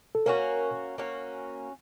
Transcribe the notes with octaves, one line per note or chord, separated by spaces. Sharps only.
A4
A#3 C#4 F#4 A#4
A#3 C#4 F#4